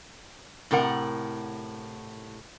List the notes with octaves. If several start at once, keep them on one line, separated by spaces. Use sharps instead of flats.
A2 C3 A#4 F#5